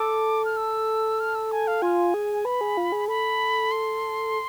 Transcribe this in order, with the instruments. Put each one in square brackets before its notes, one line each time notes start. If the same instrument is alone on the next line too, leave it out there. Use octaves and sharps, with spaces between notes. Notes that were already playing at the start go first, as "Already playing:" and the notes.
Already playing: [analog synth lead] A4 [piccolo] D6
[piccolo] F6
E6
F6
E6
G#5
F5
[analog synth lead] F4 [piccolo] G#5
[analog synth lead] G#4
[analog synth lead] B4 [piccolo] B5
[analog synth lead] G#4
F4
G#4
[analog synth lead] A4 [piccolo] B5
[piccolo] C6